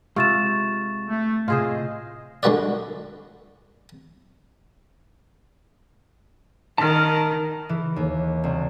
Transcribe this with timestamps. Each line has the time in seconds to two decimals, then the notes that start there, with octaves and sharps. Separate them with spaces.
0.16 C3 G#3 F4 C#6 A6 E7
1.08 A3
1.48 A2 C3 F4 G#4 C5 D#5
2.43 D3 G#3 F#4 B4 D5
6.78 D#3 A5 F6
7.69 E3
7.96 D#2
8.44 C2